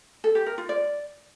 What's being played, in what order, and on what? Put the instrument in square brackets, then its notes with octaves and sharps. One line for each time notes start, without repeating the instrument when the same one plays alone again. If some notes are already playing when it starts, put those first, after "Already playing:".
[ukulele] A4
G4
A#4
F4
D5